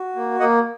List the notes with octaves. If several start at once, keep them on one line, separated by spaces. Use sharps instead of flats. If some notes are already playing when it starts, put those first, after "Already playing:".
Already playing: F#4
A#3
A#3 D#5 F#5